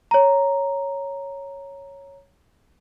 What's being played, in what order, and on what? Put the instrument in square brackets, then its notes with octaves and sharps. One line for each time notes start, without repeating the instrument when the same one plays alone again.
[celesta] C#5 A#5